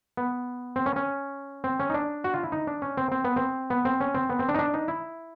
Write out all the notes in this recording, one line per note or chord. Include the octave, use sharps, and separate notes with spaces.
B3
C4
C#4
C#4
C4
C#4
D#4
D4
F#4
F4
E4
D#4
D4
C#4
C4
C4
B3
C4
B3
C4
C#4
C4
B3
C4
D4
D#4
D4
D#4
E4